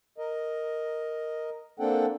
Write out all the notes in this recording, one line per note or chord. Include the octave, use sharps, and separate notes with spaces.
A#4 D#5
A#3 C4 D4 A4 F#5 G5